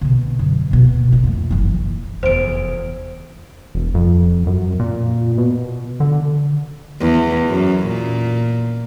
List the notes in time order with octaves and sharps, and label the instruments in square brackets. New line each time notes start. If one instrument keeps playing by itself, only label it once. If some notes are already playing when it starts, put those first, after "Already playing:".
[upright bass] B2 D3
F#2
D1 B2
A2 D3
F2 A3
F#1 E3
[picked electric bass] F1 E2 [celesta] C5 D7
[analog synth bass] E1
F2
F#2
A#2
B2
D3
[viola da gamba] E2
F#2
A#2